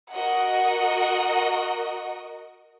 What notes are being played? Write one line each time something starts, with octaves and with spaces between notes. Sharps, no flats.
F#4 A#4 D#5 F#5